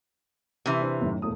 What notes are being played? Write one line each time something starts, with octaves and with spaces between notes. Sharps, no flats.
C3 E3
D4 C5
F#2 A2 D#3
E1 A3 D#6